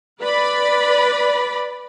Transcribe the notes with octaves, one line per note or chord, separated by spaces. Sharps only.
B4 D5 B5